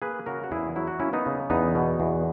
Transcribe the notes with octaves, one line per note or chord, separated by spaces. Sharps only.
A#3 G#4 B4
C#3 F#4 A#4
F#4
E2 E4 G#4
F#3 E4
F#4
A#3 C#4 E4
B3 D#4
C#3
E2 B3 D#4
B2
E2